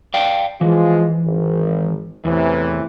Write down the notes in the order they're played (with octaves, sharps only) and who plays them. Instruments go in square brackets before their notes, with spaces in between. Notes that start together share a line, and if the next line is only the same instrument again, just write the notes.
[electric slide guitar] D5 F5 G5
[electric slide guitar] E3 [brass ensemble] F3 G#3 F4
[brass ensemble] G#1
[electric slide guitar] E2 [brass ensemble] A2 C3 E3